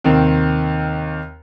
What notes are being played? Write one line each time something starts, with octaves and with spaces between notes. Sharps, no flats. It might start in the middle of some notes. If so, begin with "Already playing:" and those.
D#2 C3 D#3 C4